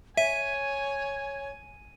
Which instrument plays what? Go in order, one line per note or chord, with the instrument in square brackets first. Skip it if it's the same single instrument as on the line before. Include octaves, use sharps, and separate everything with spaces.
[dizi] C#5 [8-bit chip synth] E5 [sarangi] G#5 [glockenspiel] D#7